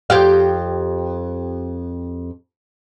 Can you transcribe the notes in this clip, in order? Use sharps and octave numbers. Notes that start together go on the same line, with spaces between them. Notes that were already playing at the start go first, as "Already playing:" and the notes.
F2 G4 F5